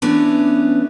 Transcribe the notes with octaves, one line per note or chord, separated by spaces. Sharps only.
E3 A3 B3 C#4 D4